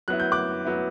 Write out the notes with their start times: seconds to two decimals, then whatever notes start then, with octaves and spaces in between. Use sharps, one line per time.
0.08 F#3 B3 E4 F#6
0.20 G6
0.32 D6 F#6
0.65 F#3 B3 E4